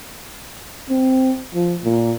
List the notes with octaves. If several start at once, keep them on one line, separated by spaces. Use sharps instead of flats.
C4
F3
A#2